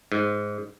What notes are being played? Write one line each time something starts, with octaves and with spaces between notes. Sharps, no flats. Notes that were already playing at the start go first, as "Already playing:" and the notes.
G#2